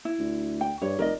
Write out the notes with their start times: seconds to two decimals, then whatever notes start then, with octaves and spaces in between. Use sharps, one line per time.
0.05 E4
0.19 D2
0.61 G5
0.82 G2 C#5
0.99 F1 A#4 D5 D#5